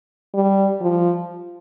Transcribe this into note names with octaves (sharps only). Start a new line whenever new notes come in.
G3
F3